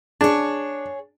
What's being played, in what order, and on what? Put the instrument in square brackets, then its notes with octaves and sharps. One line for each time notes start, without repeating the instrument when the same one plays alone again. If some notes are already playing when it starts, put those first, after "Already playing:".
[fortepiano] D4 [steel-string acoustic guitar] G#4 C#5